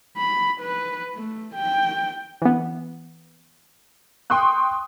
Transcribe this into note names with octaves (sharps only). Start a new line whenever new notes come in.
B5
B4
A3
G5
E3 B3
G5 C6 C#6 D#6 F#6